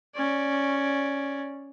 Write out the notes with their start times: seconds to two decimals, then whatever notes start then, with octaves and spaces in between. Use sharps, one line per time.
0.15 C#4 D5